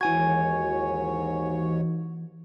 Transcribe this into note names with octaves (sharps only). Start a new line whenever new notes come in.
D#2 G#2 E3 F#4 C#5 G#5 G#6